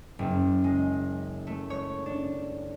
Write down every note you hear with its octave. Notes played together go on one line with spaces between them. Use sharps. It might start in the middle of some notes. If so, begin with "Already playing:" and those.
F#1
G#3
A3
C#5
D4